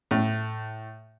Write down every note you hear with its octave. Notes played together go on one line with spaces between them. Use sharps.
A2